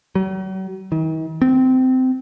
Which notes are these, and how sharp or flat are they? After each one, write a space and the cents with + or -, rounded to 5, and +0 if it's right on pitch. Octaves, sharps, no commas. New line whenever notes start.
F#3 +45
D#3 +45
C4 -20